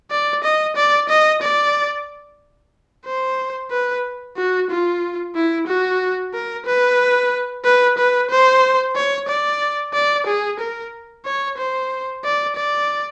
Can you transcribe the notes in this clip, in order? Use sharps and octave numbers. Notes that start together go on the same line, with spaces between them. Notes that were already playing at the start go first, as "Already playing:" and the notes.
D5
D#5
D5
D#5
D5
C5
B4
F#4
F4
E4
F#4
A#4
B4
B4
B4
C5
C#5
D5
D5
G#4
A#4
C#5
C5
D5
D5